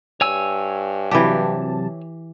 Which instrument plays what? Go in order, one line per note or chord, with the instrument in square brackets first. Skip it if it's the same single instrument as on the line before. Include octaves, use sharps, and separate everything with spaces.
[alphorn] G2 [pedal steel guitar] C#5 G#5 E6
[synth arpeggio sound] C3 F#3 A5 [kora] E3 G4